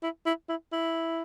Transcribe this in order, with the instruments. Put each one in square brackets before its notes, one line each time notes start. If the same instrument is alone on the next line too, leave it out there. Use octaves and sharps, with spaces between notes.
[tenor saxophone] E4
E4
E4
E4